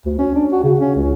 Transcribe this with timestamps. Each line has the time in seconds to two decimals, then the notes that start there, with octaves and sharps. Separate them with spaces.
0.05 D2
0.19 C#4
0.35 D4
0.52 F#4
0.64 C#3
0.80 C#4
0.96 C#2